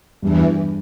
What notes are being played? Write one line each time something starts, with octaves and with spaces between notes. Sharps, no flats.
E2 G2 E3 G3 D4